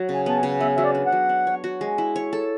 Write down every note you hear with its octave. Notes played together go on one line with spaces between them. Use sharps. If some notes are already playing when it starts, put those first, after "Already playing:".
Already playing: F#3
C#3
G#5
B3 A5
G#5
C#3
B3 E5
F#3 E5
D5
D4
F#5
F#3
D4
C#5
F#4
G#3
E4
C#5
A4